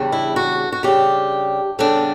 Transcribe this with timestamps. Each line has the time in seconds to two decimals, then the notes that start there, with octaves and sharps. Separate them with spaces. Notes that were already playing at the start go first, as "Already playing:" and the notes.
Already playing: E2 C#3 G3 D4
0.12 E4
0.36 F#4
0.72 F#4
0.83 C#3 G3 D4 G4
1.79 C#3 G3 B3 D4 A4